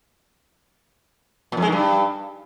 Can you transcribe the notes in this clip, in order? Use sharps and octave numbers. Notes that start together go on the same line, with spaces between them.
A#2
F2
G#3
D#3
G2